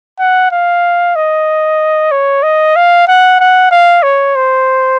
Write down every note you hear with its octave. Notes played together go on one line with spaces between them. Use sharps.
F#5
F5
D#5
C#5
D#5
F5
F#5
F#5
F5
C#5
C5